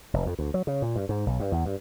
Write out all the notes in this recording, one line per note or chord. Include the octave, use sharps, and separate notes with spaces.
F1
F2
D2
F#3
C#3
A#2
G2
G#2
B1
G2
E2
G2